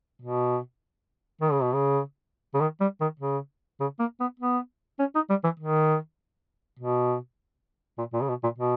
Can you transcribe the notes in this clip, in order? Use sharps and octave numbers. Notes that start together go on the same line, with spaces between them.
B2
D#3
C#3
B2
C#3
C#3
D#3
G3
D#3
C#3
C#3
A#3
B3
B3
C#4
D#4
G3
E3
D#3
B2
A#2
A#2
C#3
B2
A#2
B2